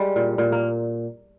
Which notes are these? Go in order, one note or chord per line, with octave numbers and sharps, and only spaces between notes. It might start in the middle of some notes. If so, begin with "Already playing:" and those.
Already playing: G3 G#3
A#2
A#2
A#3